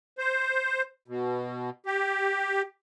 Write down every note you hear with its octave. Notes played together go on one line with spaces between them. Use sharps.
C5
B2
G4